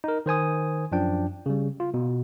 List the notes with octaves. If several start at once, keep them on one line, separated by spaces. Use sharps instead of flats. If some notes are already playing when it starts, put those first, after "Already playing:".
D#4 A#4
D#3 C5 G#5 D#6
F#2 F3 D4 G5
C#3 G3
F4
B2